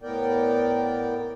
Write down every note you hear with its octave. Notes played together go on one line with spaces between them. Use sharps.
A2 B3 A#4 D5 G5